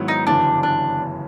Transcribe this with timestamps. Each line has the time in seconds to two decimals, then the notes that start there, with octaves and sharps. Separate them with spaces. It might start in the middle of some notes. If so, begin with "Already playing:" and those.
Already playing: G#2 D#3 F#3 B3 E4
0.08 D#4
0.27 G1 F#2 C#3 E3 D4
0.63 D4